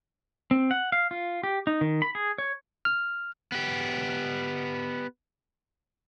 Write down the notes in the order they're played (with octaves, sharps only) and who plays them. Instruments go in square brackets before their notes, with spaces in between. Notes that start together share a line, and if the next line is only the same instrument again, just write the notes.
[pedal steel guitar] C4
F#5
F5
F4
G4
D#4
D#3
B5
G#4
C#5
[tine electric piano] F6
[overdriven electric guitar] B3 G4